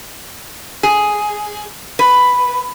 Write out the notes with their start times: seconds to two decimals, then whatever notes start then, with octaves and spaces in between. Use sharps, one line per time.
0.83 G#4
1.99 B4